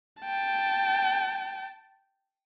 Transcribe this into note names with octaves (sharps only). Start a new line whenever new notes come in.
G5 A5